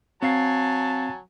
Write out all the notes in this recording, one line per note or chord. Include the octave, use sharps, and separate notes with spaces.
F#3 C4 F5 G#5 A5 C7